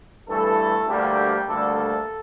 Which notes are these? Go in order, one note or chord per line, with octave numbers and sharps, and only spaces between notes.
G2 E3 A3 A4
D2 D3 G3 A#3 G4
D2 D3 G3 A#3 A4
A4